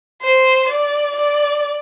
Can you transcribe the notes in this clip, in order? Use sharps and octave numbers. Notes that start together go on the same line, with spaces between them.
C5
D5
D5